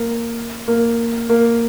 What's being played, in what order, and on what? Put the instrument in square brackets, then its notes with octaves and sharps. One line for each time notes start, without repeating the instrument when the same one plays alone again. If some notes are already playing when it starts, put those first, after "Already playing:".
Already playing: [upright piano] A#3
A#3
A#3